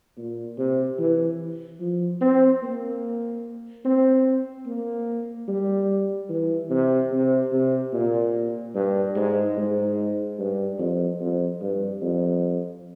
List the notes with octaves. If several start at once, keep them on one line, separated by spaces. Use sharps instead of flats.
A#2
C3
E3
F3
C4
A#3
C4
A#3
G3
E3
C3
C3
C3
A#2
G2
G#2
G#2
G2
F2
F2
G2
F2